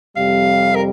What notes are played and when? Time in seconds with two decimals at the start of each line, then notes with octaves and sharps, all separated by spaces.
0.16 F2 C3 G3 F5
0.75 A#4